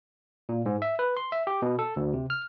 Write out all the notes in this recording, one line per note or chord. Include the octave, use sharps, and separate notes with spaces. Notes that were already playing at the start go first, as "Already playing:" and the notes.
A#2
G#2
E5
B4
C6
E5
G4
B2
A4
D2
C3
F6